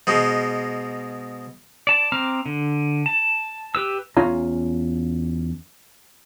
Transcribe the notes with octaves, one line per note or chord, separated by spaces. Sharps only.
G#2 B2 G#3
D5 A5
C4 A#5 D6 F6
D3
A5
G4 B4 E6
E2 C#4 F4 A#5